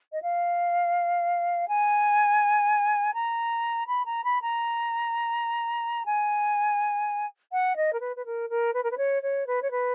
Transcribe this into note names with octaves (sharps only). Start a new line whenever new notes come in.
D#5
F5
G#5
A#5
B5
A#5
B5
A#5
G#5
F#5
D#5
A#4
B4
B4
A#4
A#4
B4
A#4
B4
C#5
C#5
B4
C#5
B4